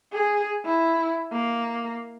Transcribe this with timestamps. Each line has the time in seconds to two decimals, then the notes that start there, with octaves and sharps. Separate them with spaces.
0.12 G#4
0.65 E4
1.32 A#3